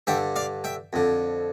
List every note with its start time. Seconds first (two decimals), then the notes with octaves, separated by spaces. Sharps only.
0.07 G2 D3 E5 G5
0.36 D5 F5
0.64 E5 G5
0.93 F2 D3